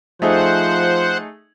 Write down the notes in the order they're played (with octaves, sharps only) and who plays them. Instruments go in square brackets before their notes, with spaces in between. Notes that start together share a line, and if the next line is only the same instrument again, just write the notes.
[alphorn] F3 [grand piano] A3 D#4 G#4 [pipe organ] C5 F#5